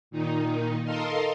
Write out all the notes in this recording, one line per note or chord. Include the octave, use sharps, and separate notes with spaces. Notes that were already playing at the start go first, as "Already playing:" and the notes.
A#2 D#3 D#4
A4 A#4 D#5 F5 C6